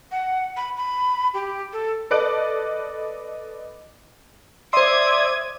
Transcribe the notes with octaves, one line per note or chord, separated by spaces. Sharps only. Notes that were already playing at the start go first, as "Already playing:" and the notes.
F#5
B5
B5
G4
A4
A4 B4 D5 D#5 F#6 D7
C5 D5 E5 C6 D#6 G#6